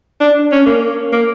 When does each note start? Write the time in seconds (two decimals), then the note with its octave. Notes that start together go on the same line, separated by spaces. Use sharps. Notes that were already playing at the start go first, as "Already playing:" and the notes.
0.21 D4
0.52 C#4
0.66 A#3
1.13 A#3